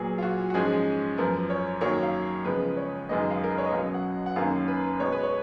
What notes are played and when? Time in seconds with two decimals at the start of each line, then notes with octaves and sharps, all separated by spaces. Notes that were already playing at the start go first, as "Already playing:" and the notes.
Already playing: A#2 F#3 B3 G#4
0.18 F4
0.23 F#4
0.50 F#4
0.54 G#2 F3 G#3 C#4 G#4
1.18 F#2 F3 B3 A#4
1.50 C#5
1.81 F#2 D#3 F#3 A#3 C#5
2.03 F5
2.45 C#3 F3 G#3 B3 B4
2.77 C#5
3.09 F#2 D#3 G#3 B3 D#5
3.31 F5
3.44 A#4
3.50 B4
3.58 C#5
3.66 D#5
3.72 B2 F#3 C#4 F5
3.94 F#5
4.26 F#5
4.36 F#2 D#3 A#3 C#4 F5
4.68 B4
5.00 B2 G#3 B3 C#5
5.12 B4
5.23 C#5